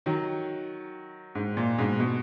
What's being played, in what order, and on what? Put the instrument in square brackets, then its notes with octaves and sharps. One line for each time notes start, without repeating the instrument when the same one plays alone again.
[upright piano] D#3 F#3
G#2
A#2
G#2 B2
B2